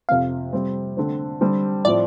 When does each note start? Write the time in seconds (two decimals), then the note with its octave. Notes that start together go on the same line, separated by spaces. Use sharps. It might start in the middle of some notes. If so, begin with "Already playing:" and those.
0.09 F2 C3 F3 C4 F5
0.53 C3 G3 C4
0.97 D3 A3 C4
1.41 D3 G3 C4
1.85 A2 F3 C4 D5